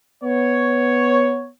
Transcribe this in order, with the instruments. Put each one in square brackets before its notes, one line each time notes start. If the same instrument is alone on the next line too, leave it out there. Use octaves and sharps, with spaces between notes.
[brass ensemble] B3 C#5